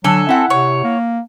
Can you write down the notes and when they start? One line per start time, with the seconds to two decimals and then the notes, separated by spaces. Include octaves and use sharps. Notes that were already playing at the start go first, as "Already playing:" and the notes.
0.04 D3 F#3 A4 G#5
0.29 C4 E4 F#5
0.50 C3 C#5
0.84 A#3